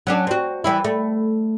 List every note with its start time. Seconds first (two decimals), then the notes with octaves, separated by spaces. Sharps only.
0.07 F#3 C#4 D4
0.27 C4 F#4
0.64 E3 G3 E4
0.84 A3